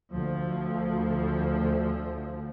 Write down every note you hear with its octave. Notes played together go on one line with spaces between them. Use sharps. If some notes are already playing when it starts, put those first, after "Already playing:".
D2 F3